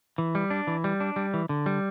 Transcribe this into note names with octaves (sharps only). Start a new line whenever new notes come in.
E3
G3
D4
E3
G3
D4
G3
E3
D3
G3